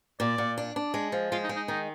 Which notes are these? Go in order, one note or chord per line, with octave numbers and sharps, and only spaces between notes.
A#2 D5
A#2
D4
D4
G#3
F3
G#3 F4
D#4
G#3
D#4
D#3 D#4